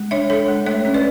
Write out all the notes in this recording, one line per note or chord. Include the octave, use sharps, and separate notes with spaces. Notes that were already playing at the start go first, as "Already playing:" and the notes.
Already playing: G#3
D4 C#5 E5
D4 A4 C#5
G#3
A3 C#5 E5
C#4
B4 D5